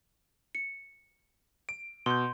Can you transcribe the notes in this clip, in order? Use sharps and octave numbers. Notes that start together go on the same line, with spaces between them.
C#7
D7
B2 C6 G6